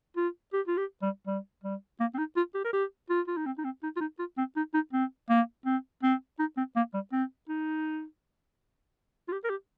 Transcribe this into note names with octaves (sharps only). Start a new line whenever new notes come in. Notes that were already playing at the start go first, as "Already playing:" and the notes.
F4
G4
F4
G4
G3
G3
G3
A#3
C4
D#4
F4
G4
A#4
G4
F4
F4
D#4
C4
D#4
C4
D#4
F4
D#4
F4
C4
D#4
D#4
C4
A#3
C4
C4
D#4
C4
A#3
G3
C4
D#4
F4
G4
A#4
G4